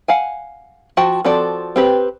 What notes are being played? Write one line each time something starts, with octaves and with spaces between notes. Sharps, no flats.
F5 F#5 G#5
F3 F#4 G5 A5
F3 C4 F#4 A4 D5
C4 G4 B4